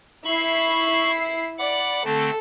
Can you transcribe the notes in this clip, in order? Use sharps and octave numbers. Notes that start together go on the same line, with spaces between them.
E4 B5 C#6 C7
D5 F#5 B5 D6
D3 A3 C4 A4